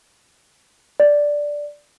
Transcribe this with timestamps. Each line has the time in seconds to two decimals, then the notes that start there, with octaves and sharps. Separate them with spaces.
1.00 D5